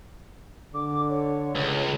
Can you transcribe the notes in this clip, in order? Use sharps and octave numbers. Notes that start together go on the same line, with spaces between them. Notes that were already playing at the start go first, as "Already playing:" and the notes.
D3 D6
C#5
C#2